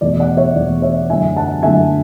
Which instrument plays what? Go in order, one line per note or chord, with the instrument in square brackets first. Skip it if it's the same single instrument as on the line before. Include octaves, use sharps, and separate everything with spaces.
[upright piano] E2 B2 A3 D5
D5 F#5
C#5 E5
E2 B2 A3 D5
C#5 E5
F#2 D3 A3 E4 E5 G#5
F#5 A5
F#2 D3 A3 E4 E5 G#5